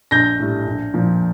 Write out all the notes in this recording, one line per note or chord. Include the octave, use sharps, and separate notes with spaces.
A#1 G6 A#6
A2 G3
A#1
A#2 F3